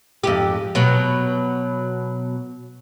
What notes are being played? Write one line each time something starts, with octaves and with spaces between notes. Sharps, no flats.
F2 G#2 G4
B2 F#3